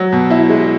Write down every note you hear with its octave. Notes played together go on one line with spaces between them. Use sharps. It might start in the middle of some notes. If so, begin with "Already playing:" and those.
Already playing: F#3
B2
E4
G#3